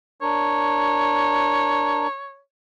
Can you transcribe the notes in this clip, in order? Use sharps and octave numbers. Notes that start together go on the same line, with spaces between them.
D4 A#4 C#5